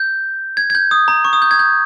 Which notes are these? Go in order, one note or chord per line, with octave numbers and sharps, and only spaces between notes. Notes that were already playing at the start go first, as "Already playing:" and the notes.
Already playing: G6
G#6
G#6
G6
D#6
A#5
C#6
D#6
G6
G#6
G6